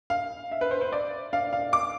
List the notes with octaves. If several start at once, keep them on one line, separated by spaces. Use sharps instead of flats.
F5
E5
B4
C5
C5
D5
F5
F5
D6